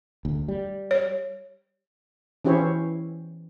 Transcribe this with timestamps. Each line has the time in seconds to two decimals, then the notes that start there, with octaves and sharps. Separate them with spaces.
0.25 D2
0.48 G3
0.91 C#5
2.45 E3 C#4 E4 G4 C5 C#5